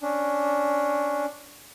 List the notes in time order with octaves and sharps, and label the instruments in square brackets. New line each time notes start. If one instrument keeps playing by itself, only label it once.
[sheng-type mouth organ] C#4 D4